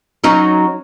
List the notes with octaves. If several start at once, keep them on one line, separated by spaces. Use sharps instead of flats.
F#3 C#4 D#4